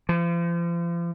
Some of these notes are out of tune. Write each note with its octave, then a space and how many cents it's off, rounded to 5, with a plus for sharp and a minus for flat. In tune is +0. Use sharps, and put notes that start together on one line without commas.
F3 -40